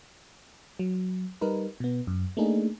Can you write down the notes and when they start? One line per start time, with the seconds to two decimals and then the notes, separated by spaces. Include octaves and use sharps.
0.79 F#3
1.41 G3 D#4 A#4 B4
1.80 B2 B3
2.07 F#2
2.37 A3 A#3 D4 D#4 G#4